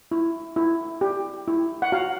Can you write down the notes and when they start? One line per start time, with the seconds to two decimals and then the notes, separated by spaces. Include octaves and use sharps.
0.11 E4
0.56 E4
1.01 G4
1.48 E4
1.82 F#5
1.92 F#4 F5